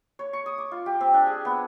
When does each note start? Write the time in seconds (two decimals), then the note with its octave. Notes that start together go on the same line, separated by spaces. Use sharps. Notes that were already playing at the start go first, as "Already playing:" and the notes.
0.19 C#5
0.33 C#6
0.46 D#6
0.58 D6
0.72 F4
0.86 G4
1.01 C4
1.14 D4
1.26 G#4
1.45 B3